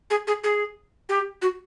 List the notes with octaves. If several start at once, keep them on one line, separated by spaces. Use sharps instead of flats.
G#4
G#4
G#4
G4
F#4